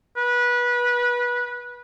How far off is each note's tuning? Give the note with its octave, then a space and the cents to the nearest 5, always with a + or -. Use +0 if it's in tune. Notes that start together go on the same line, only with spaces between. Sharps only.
B4 -20